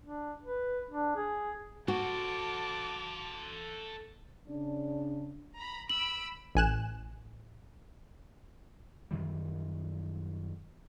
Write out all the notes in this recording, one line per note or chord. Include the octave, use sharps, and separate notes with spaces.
D4
B4
D4
G#4
F#4 A4 C5 A5 D6
C#3 D4
A#5 B5
B5 E6 D7 F#7
A1 G#5 F#6 E7
F#2 D#3 E3 G3